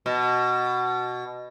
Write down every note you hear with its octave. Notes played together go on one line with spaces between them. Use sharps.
B2